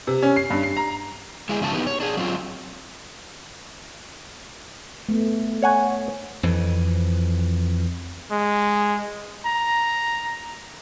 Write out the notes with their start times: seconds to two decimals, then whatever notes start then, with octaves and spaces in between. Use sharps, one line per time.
0.07 C3
0.23 C#4
0.36 C7
0.50 G2
0.63 C7
0.77 A#5
1.49 G#3 E4 G#4
1.61 G#2 C#3 F3 F#3 G4 A5
1.73 B3 D#4 G4 B4
1.87 C#5
2.00 D4 G#4
2.17 F#3 C4 F4
5.09 A3 B3
5.62 C#5 F#5 G#5
6.43 F2 E3
8.31 G#3
9.46 A#5